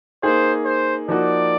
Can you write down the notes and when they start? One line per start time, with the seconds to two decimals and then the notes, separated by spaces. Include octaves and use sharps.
0.23 A#3 D#4 G#4 C5
0.65 C5
1.08 F3 A#3 D#4 F#4 D5